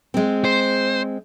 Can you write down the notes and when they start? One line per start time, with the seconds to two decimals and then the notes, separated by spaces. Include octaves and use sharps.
0.14 G#3 C4
0.45 C5